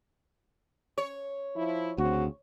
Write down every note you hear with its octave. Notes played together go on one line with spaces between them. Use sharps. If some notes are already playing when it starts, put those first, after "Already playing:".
C#5
F3 E4
D2 C#3 C4 F#4